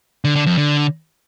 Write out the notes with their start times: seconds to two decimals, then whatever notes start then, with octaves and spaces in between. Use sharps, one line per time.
0.24 D3
0.35 D3
0.46 F2
0.57 D3